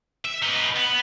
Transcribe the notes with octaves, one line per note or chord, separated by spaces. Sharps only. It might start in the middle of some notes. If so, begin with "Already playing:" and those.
E5
D#4 B4
B3